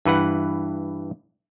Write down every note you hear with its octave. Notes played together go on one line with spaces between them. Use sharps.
G2 E3 B4 F#5